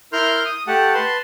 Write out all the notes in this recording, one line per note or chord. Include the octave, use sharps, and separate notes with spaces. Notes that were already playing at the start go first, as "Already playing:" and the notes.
E4 A#4 C6 F6 G6
D#6
A3 G4 F#5 A5
B4 A5 C6